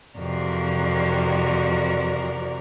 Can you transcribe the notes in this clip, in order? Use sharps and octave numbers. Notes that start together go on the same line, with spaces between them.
F2 C3 E3 F#4 A#4 D5